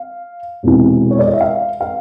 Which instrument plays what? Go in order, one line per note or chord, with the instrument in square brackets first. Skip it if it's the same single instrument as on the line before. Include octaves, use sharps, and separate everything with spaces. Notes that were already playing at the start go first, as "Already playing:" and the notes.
Already playing: [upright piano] F5
E1 E2 C3 E3
C#5
D5
D#5
E5
F5
F5